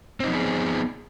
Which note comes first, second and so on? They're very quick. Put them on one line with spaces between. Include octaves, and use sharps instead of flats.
C4 D#4 F3 B3 G#4